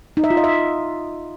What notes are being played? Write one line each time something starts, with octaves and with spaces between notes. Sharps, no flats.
D#4
E5
F4
D#5
E5